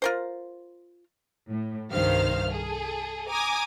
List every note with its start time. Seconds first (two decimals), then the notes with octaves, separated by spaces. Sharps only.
0.02 F4 A#4 C5
1.47 A2
1.92 C2 G2 D#3 C5 F5 F6
2.51 G#4 A4
3.29 G#5 A#5 D6 D#6 G#6